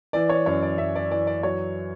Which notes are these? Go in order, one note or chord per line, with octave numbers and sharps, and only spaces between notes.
E3 D5
C#5
F#2 C#5
D5
F#2 E5
D5
E3 D5
D5
F#3 C#5